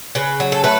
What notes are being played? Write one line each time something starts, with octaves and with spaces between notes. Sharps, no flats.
C#3 B4
F#3
A4
A3 B4